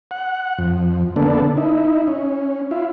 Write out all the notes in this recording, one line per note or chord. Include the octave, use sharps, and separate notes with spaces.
F#5
F2
D3 A#3 B3 D4 A4
D#4 E4
C#4
E4 F4